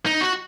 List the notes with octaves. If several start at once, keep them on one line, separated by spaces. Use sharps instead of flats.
D#4
F#4